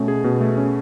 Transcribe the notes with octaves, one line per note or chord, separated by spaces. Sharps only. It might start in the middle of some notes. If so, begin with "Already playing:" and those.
Already playing: B2 A3 C#4
G#4
B2
A3
C#4